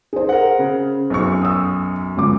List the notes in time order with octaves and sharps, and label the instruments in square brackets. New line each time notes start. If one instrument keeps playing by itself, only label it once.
[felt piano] G#4 C5
[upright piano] A#4 F#5
C#3
B1 F#2 C#6
[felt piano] D#6 E6
C#2 D6